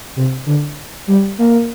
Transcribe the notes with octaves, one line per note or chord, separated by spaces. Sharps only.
C3
D3
G3
A#3